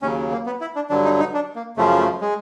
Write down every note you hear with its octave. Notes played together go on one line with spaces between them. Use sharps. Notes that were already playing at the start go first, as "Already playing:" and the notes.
D#2 C#3 F#3 C#4
A#3
B3
E4
D4
G2 D3 F#3 D4
D#4
D#4
D4
A#3
F#2 C#3 F3 A3
A3
G#3